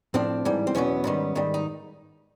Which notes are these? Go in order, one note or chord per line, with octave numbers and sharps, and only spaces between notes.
A2 F3 C4 D4
G#2 E3 G3
C4
E2 B2 F#3 B3 C#4
G#2 D#3 G3
G#2 D#3 G3
D#4